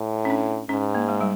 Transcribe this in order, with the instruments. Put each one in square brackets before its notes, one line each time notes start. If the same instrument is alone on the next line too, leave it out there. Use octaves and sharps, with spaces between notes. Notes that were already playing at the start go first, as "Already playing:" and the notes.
Already playing: [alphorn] A2
[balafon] C#4
D4
[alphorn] G#2 [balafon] C#4
[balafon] A#3
G#3
G3